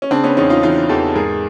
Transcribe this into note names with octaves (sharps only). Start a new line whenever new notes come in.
C#4
C#3 C4 D4
B3 C#4
E2 C#4 D#4
D#4 F4
E3 D#4 F4
E2 G4 A4
G#2 G#4 A#4